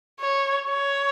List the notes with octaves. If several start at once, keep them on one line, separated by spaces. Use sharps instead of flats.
C#5
C#5